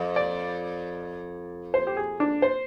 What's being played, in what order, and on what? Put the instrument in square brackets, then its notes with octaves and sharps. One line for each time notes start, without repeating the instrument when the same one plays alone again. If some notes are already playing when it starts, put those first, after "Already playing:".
Already playing: [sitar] F2
[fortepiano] D5
C5
G4
G#4
D4
C5